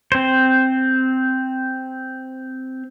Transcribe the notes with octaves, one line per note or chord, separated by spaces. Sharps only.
C4 C5